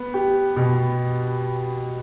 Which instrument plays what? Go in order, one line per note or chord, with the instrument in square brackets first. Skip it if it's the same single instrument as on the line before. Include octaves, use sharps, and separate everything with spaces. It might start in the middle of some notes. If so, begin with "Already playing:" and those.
Already playing: [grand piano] B3
G4
B2